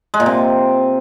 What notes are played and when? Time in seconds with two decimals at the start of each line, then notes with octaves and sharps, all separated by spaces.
0.14 G#3
0.20 A#2
0.26 C3